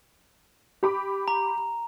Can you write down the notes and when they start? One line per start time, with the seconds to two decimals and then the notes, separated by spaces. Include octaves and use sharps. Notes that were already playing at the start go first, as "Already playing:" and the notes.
0.83 G4 B5 D6
1.28 A#5